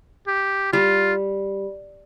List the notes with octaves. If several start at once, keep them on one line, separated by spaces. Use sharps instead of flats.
G4
G3 F4